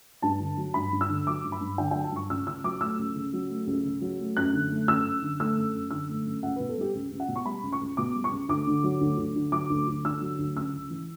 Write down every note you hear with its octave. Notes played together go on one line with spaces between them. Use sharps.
G2 A5
D3
F#3
G2 B5
G2
E6
D3
F#3 D6
G2
B5
G2
D3 G5
F#3 G5
A5
G2 C#6
C#2 E6
C#3 E6
F#3 D6
A3 E6
C#2
C#3
F#3
A3
C#2
C#3
F#3
A3
F#2 F#6
D3
A3
F#2 E6
F#2
D3
A3 E6
F#2
F#2
D3 E6
A3
F#2
C#2 F#5
B2 B4
A4
G3 G4
C#2
C#2
F#5
B2
C#6
G3 B5
C#2
C#6
C#2
B2 D6
G3
C#6
C#2
D2 D6
D3
F#3
D2
D2
D3
F#3 D6
D2
D2
D3 E6
F#3
D2
C#2 E6
C#3
E3